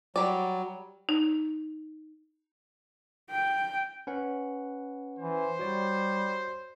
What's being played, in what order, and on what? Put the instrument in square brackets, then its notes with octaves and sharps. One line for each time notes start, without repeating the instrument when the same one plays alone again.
[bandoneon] F#3 [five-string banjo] G3 D5
[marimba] D#4
[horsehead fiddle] G5
[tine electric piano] C#4 B4 F#5
[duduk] E3 [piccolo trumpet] C5
[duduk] G3 [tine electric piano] F#4 C#5 D5